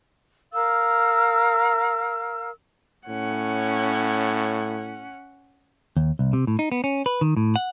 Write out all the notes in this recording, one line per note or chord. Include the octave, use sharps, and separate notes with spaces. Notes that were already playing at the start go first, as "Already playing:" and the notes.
A#4 F5 E6
A2 C#4 F#5
D#2
C2
C3
A2
D#4
B3
C#4
B4
D#3
A2
F#5